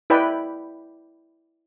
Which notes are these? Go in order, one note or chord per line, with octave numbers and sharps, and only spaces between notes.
E4 B4 D5 D#5 G5 B5